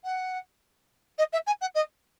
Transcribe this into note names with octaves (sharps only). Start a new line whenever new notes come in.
F#5
D#5
E5
G#5
F#5
D#5